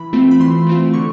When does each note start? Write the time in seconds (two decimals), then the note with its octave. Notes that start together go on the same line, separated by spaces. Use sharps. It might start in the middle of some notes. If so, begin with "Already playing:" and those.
Already playing: E3 B5
0.13 A3 C4 F4
0.31 B5
0.40 E3 C6
0.66 A3 C4 F4
0.94 D3 C#6